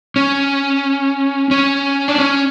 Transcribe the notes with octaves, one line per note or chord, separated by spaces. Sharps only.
C#4
C#4
D4
C#4